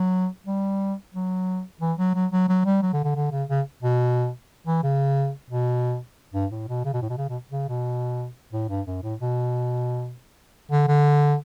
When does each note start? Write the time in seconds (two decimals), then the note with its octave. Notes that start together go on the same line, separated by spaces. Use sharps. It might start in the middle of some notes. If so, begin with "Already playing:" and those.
Already playing: F#3
0.47 G3
1.14 F#3
1.81 E3
1.98 F#3
2.15 F#3
2.32 F#3
2.49 F#3
2.65 G3
2.82 F#3
2.93 D3
3.04 D3
3.15 D3
3.32 C#3
3.49 C#3
3.83 B2
4.67 E3
4.83 C#3
5.50 B2
6.34 G2
6.51 A2
6.68 B2
6.85 C#3
6.94 B2
7.02 A2
7.10 B2
7.18 C#3
7.29 B2
7.52 C#3
7.69 B2
8.53 A2
8.69 G2
8.87 F#2
9.03 A2
9.20 B2
10.71 D3
10.88 D3